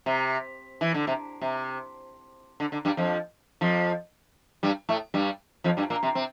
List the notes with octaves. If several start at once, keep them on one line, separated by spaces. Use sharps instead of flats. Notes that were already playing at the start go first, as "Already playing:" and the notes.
C3
E3
D3
C3
C3
D3
D3
G2 G3
F2 F3
F2 F3
G2 G3
A2 A3
G2 G3
F2 F3
G2 G3
A#2 A#3
C3 C4
C3 C4